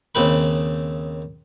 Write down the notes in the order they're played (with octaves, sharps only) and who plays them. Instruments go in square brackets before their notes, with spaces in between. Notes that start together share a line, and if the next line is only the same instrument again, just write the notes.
[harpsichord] D#2 C#3 C4 B4 B5